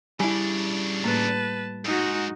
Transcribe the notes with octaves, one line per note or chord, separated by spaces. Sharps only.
C#3 G3 D4 E4 G#5
A2 A3 A#3 B4 A5
G#2 D#4 F#4